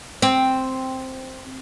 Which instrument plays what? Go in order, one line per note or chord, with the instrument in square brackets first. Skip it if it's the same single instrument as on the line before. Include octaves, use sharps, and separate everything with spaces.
[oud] C4